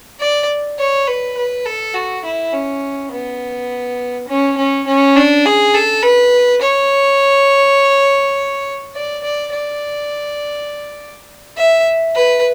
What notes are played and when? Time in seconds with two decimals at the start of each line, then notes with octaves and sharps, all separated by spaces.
0.20 D5
0.79 C#5
1.07 B4
1.37 B4
1.66 A4
1.95 F#4
2.25 E4
2.53 C#4
3.12 B3
4.28 C#4
4.57 C#4
4.87 C#4
5.16 D4
5.45 G#4
5.74 A4
6.03 B4
6.61 C#5
8.95 D5
9.24 D5
9.53 D5
11.57 E5
12.16 B4